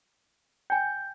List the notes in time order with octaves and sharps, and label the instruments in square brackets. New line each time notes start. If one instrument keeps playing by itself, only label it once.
[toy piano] G5 G#5 [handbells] G6